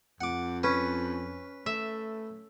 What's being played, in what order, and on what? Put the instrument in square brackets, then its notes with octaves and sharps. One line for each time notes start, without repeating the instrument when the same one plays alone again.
[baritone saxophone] F2 [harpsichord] F#5 D6
[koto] C#4 [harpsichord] B4
[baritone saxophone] A3 [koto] E5